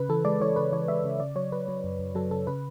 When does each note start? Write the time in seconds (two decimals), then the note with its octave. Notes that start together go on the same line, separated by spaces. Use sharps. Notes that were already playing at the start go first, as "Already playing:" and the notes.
Already playing: C#3 B4
0.09 E3 A4
0.25 G#3 D5
0.40 E3 C#5
0.56 C#3 B4
0.72 E3 C#5
0.88 G#3 E5
1.04 C#3
1.20 C#3 D5
1.36 F#3 C#5
1.52 F#3 B4
1.68 F#3
1.84 F#2
1.99 F#2
2.15 F#3 A4
2.31 C#3 A4
2.47 C#3 B4